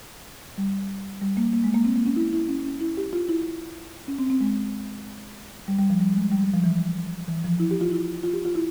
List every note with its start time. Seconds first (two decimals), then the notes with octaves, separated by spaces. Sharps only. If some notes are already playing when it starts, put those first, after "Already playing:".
0.58 G3
1.22 G3
1.37 A#3
1.53 A#3
1.64 G#3
1.75 A#3
1.85 C4
1.96 A#3
2.06 C#4
2.16 E4
2.33 E4
2.49 C#4
2.64 C#4
2.81 E4
2.97 G4
3.13 F4
3.29 E4
4.08 C#4
4.19 C4
4.30 C4
4.41 G#3
5.68 G3
5.79 G3
5.90 F3
6.01 G3
6.16 G#3
6.32 G3
6.43 G3
6.54 F3
6.64 E3
7.28 E3
7.44 F3
7.60 E4
7.71 G4
7.81 F4
7.91 E4
8.23 F4
8.33 G4
8.45 F4
8.55 E4